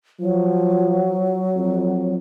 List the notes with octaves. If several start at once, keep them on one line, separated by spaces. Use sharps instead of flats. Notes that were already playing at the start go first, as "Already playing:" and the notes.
F3 F#3
F2